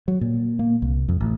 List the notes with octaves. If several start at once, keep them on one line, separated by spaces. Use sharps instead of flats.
F#3
A#2
A#3
C2
F2
A1